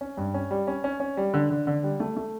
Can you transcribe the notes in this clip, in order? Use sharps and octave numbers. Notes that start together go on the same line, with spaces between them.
C#4
G2
C#4
G3
C#4
C#4
C#4
G3
D3
D3
D3
G3
A3
A3